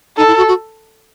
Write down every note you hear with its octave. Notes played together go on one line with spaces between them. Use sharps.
D#4 A4
E4
F#4
F#4